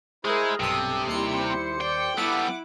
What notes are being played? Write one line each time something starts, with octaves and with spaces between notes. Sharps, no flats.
G#3 E4 G#4 A#4 C5
B1 G2 C3 A4 D#6
D#2 G3 E4 C6 C#7
C5
D5 G5
G3 B3 E4 A4 F#5 D6